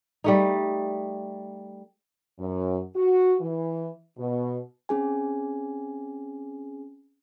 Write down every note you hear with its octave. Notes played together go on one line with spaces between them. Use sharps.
G3 A3 D#4
F#2
F#4
E3
B2
C4 C#4 G#4 G#5